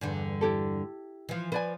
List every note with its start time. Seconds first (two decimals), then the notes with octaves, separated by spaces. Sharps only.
0.01 E2 G2 D3
0.41 E4 G4 A4
1.29 E3 F3
1.52 F3 B4 D5 G#5